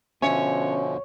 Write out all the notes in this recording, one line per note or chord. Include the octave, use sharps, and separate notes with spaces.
B2 D3 F3 C#4 C#5 E5 G#5